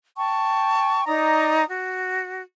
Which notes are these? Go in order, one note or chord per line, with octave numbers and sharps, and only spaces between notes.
G5 A5 C#6
D#4 D5 A#5 D#6
F#4